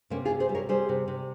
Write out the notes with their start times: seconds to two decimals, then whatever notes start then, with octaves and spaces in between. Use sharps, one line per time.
0.10 C3 A#3 C#4
0.25 F4 G#4
0.31 C3
0.40 G#4 C5
0.49 G3
0.55 A#4 C#5
0.69 G3 G#4 C5
0.89 C3
1.08 C3